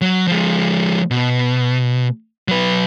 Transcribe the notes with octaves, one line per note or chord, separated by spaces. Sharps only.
F#3
F3 G#3
B2
F#3 B4